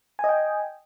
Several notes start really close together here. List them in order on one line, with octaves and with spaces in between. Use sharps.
G#5 D#5 G5